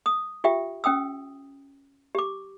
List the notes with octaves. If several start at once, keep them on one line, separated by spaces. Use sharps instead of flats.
D#6
F4 G4 E5 G5
C#4 G5 D#6 E6
G4 D6